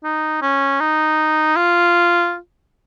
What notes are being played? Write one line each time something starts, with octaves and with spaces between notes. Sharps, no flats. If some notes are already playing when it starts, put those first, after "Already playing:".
D#4
C#4
D#4
F4